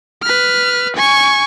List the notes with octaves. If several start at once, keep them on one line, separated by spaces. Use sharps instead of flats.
B4 F6
G#5 C#6